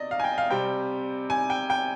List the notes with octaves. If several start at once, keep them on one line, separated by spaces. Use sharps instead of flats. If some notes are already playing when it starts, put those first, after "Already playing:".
Already playing: C3 D5 D#5
F5
G#5
G5
F5
C3 G3 C4 G5
G#5
G5
G5